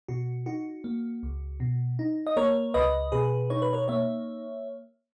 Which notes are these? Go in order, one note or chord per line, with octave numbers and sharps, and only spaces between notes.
B2 F#4
D#4 F#4
A#3
C#2
B2
D#4
D#5
A#3 A#4 C#5
C#2 B4 D#5
B2 G#4 B4
D#4 C#5
B4
A#4 C#5
A#3 C#5 E5